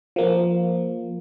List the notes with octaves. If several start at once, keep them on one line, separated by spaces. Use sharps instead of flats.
F3 A#3